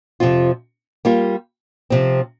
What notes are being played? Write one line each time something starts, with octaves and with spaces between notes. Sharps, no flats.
F2 C3 F3 C4 F4
G3 A#3 F4
C3 F3 C4